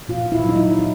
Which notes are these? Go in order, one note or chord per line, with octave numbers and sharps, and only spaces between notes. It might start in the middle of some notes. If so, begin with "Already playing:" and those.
A#2 F4
E4
F#3 D#4
E4
E4